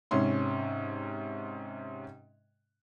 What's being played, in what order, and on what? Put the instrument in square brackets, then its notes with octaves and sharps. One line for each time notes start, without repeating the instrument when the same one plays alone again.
[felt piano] G#2 C3 C#4 C6